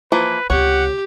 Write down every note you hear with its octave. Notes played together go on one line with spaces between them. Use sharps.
E3 F3 A#3 B4
C#2 C3 G4 C#5 F#5